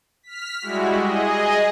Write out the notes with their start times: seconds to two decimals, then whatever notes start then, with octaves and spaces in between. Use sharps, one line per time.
0.23 F6 B6
0.61 G3 G#3 E4 F#4
0.97 G#4 D#5